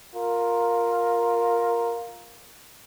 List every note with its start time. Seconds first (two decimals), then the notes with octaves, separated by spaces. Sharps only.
0.15 F4 A#4